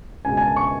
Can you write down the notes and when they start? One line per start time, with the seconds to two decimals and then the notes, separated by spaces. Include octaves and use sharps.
0.25 C#2 B2 G#3 G#5
0.37 G#5
0.41 A5
0.56 C#6